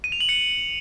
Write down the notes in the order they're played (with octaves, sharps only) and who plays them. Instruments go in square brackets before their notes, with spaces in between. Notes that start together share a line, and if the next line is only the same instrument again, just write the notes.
[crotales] D#7
F7
F#7
C#7